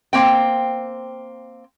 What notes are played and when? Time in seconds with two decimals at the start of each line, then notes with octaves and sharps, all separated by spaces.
0.13 A#3 C4 G5